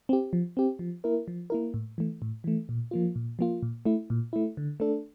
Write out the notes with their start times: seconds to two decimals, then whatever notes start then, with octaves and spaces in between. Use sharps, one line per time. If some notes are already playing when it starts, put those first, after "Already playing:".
0.09 C4 G4
0.33 F3
0.57 C4 G4
0.79 F3
1.04 A#3 E4 A#4
1.28 F3
1.50 A#3 E4 A#4
1.74 A2
1.98 E3 A3
2.22 A2
2.44 E3 A3
2.69 A#2
2.91 F3 A#3 F4
3.16 A#2
3.39 F3 A#3 F4
3.63 A#2
3.85 A3 E4
4.10 A#2
4.33 A3 E4
4.57 D3
4.80 A3 D4 A4